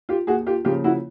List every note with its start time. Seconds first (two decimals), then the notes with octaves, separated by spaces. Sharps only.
0.09 F4 G4
0.27 D#2 F#4 G#4
0.46 F4 G4
0.65 C#3 F3 A#3 F4 G4
0.84 E4 F#4